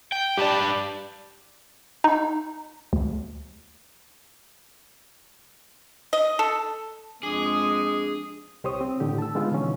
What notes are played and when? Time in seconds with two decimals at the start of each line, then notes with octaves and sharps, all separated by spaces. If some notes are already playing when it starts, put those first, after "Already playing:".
0.12 G5
0.38 G2 G4 B4 D5 A5
2.04 D#4
2.93 D2
6.13 D#5
6.39 A4
7.23 F2 G#3 D4 G#4 D#6
8.64 C2 G4 C5 C#5 D#6
8.81 C4
9.00 A2 D3 G4
9.18 A5 E6
9.35 D3 G#3 B3 D#4 F4
9.51 B2 D3 E3 F3 C#4